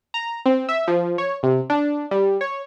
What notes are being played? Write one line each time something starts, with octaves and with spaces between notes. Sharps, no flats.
A#5
C4
E5
F3
C#5
C3
D4
G3
C#5